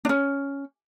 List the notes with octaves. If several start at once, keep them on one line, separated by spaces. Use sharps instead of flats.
C#4 D4